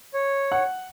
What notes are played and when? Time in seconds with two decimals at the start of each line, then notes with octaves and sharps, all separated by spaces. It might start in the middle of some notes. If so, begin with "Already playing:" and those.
0.14 C#5
0.52 F#5